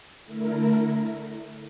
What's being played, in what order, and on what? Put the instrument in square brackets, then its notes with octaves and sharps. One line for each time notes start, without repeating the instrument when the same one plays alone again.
[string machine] D3 A3 E4 A#4